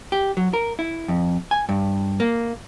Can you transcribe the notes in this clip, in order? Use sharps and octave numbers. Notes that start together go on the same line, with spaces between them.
G4
F#3
A#4
E4
F2
G#5
G2
A#3